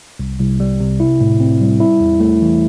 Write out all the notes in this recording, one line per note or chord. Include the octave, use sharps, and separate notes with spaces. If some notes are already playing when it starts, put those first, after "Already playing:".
C2
C2
G3
C3
E4
A2
C4
G3
E4
E2
A3
E3